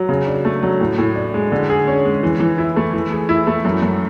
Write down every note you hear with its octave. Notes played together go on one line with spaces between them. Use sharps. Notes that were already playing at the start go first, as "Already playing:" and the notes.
Already playing: F#3
C#3
D4
A3
F#3
A2
A2
D4
G#3
D3
G#4
C#4
G#3
E3
E3
E4
A3
E3
G#4
E4
A3
F#2
F#2